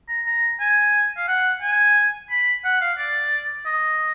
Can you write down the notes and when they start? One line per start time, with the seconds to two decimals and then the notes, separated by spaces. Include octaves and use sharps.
0.08 A#5
0.26 A#5
0.60 G#5
1.17 F5
1.28 F#5
1.62 G#5
2.30 B5
2.64 F#5
2.81 F5
2.98 D5
3.66 D#5